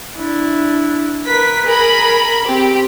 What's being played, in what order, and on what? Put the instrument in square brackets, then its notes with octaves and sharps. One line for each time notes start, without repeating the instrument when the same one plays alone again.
[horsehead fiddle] D4 E4
[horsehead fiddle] A#4 B4 [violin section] B6
[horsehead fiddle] G#4 [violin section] A#4 B5
[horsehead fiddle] C4 [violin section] G4